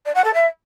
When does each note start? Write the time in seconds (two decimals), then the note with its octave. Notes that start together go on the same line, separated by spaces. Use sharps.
0.05 D5
0.15 F#5
0.24 A4
0.34 E5